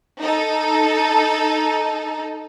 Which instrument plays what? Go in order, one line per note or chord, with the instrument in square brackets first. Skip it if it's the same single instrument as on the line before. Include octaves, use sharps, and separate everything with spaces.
[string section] D#4 A4